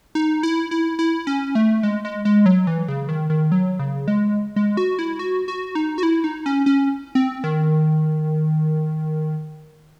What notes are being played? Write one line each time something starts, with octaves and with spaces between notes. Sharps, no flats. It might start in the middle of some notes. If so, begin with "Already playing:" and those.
D#4
E4
E4
E4
C#4
A3
G#3
G#3
G#3
F#3
E3
C#3
D#3
D#3
F#3
C#3
G#3
G#3
F#4
E4
F#4
F#4
D#4
F#4
E4
D#4
C#4
C#4
C4
D#3